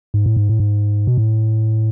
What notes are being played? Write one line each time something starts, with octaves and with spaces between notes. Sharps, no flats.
G#2
A2
G#2
A2
G#2
B2
A2